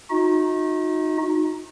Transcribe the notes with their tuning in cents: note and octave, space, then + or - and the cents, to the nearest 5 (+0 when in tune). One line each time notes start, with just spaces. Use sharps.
D#4 +0 F#4 -35 D#5 +40